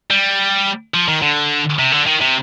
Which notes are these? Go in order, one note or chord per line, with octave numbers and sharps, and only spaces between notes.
G3
F3
D#3
D3
C3
D3
D#3
C3